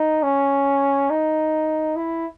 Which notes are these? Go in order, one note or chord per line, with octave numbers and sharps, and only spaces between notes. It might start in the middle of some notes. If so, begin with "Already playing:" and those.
Already playing: D#4
C#4
D#4
E4